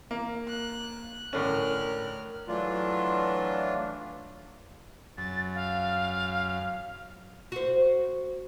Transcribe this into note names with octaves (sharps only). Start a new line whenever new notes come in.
A#3
F#6
A2 D3 C#4 A#4 F6 F#6
E3 F#3 A3 D4 F4
F#2 A6
F5
F#4 C5